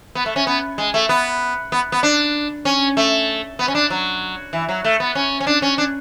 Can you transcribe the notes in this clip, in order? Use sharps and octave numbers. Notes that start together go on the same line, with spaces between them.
B3
A3
C#4
B3
G#3
A3
B3
B3
B3
D4
C#4
A3
B3
C#4
D4
F#3
E3
F#3
A3
B3
C#4
C#4
D4
C#4
D4